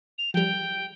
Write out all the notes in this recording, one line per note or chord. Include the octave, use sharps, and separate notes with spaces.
F7
F3 G3 G5